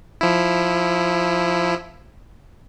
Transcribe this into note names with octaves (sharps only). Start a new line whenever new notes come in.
F3 E4